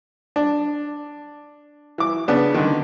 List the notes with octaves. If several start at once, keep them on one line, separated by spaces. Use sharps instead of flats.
D4
E3 D6
C#3 B3 D4
D3 D#3